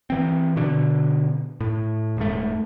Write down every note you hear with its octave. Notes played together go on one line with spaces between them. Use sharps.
E3 C4
B2 D3
A2
D#1 G#2 A3